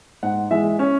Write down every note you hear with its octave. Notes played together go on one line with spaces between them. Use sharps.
G#2 F#5
E3 G#3 E5
C#4